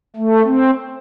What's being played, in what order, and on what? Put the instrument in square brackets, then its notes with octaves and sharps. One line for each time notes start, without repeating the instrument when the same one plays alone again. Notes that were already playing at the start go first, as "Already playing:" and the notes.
[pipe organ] A3
C4